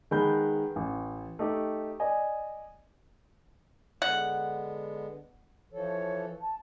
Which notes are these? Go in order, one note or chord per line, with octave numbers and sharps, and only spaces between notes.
D#3 G#3 B3 B4 B5 G6
A1
A3 D#4 G4
D5 D#5 G#5
D3 G#3 B3 F#5
E3 F3 A4 C#5
A5